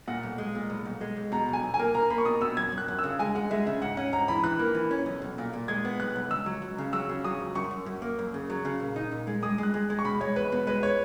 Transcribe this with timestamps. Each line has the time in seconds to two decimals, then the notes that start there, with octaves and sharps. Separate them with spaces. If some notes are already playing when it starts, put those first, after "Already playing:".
0.08 A#2 F#5
0.23 B1
0.38 G#3
0.55 A#2
0.70 B1
0.85 B1
1.01 G#3
1.17 B1
1.32 B2 A#5
1.49 B1 G#5
1.63 B1
1.74 G#5
1.79 A#3
1.94 A#3 A#5
2.10 A#3 B5
2.18 C#6
2.25 B2 D#6
2.41 B2 E6
2.57 F#2 G#6
2.72 F#2
2.78 F#6
2.88 F#2
2.99 E6
3.04 C#3
3.19 G#3 G#5
3.35 G#3 F#5
3.51 G#3 E5
3.66 C#3 E5
3.82 G#2 F#5
3.97 C#4 F#5
4.13 G#2 A#5
4.28 E3 B5
4.43 E3 F#6
4.59 A#3
4.75 E3
4.91 C#4
5.06 B1
5.22 B1
5.38 A#2
5.53 A#2
5.68 G#3 G#6
5.85 B3
6.00 B1 F#6
6.16 B1
6.31 C#2 E6
6.46 F#3
6.62 C#2
6.78 C#3
6.93 F#3 E6
7.09 C#3
7.24 F#3 D#6
7.40 C#2
7.55 F#2 C#6
7.71 F#2
7.86 F#2
8.02 A#3
8.19 F#2
8.34 C#3
8.50 F#3
8.65 C#3
8.80 A#2
8.96 D#4
9.11 A#2
9.27 G#3
9.43 G#3 D#6
9.58 G#3
9.63 F#6
9.74 G#3
9.90 G#3
9.99 C#6
10.04 B2 B5
10.21 G#3 C#5
10.36 E2 B4
10.52 B2
10.67 G#3 B4
10.83 C#5